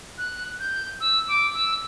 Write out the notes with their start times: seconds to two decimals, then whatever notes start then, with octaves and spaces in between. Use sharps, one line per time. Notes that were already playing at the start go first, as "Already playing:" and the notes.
0.18 F#6
0.60 G6
1.00 E6
1.28 D6
1.54 E6